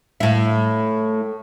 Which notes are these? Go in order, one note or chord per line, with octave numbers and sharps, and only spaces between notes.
A2 E4